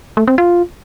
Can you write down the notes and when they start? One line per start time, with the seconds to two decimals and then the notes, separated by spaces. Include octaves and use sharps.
0.17 A3
0.27 C4
0.38 F4